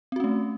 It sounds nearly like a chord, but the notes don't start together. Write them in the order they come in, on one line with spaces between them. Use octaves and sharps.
C4 F#4 C#4 A3